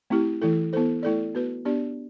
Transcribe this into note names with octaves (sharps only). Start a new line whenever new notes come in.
A3 C4 E4 G4
E3 A3 E4 A4
B3 E4 A4 C5
A3 E4 A4 D5
B3 F#4 B4
B3 D4 G4 D5